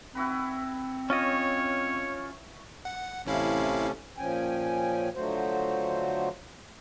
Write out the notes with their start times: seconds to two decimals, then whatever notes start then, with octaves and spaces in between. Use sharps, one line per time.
0.15 C4 E4 F#4 B4
1.10 C#4 F4 C#5 D#5 C#6
2.85 F#5
3.26 A1 C3 A3 C#4 E4 F5
4.18 A#2 F3 C#4 G5 G#5
5.15 D3 F3 F#3 A3 F#4 C5